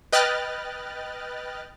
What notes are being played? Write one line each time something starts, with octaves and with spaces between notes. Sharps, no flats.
B4 D#5 G5 F6 F#6 A6